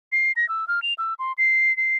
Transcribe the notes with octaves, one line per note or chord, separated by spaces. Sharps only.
C7
A#6
E6
F6
F7
E6
C6
C7
C7